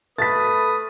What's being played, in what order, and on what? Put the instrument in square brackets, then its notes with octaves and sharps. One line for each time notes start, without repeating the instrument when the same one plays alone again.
[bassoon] A3 [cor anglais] B4 [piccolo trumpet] D#6 [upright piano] A6 B6